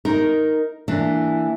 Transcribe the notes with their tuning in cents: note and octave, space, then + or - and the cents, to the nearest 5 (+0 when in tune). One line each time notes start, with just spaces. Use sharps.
D#4 +5 A#4 +0
E3 +0 A#3 -20 D4 +0